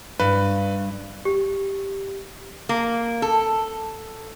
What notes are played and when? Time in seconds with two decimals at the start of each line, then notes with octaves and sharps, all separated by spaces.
0.20 G2 B4
1.25 G4
2.69 A#3
3.22 A4